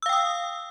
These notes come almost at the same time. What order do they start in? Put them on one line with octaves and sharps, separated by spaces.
E6 F5 G5 D#6